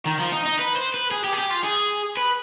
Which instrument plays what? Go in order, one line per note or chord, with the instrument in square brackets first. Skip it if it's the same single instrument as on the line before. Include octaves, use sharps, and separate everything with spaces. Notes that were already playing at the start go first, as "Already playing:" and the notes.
[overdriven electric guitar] D#3
F3
D#4
D#4
B4
C5
B4
G#4
G4
G#4
G4
F4
G#4
B4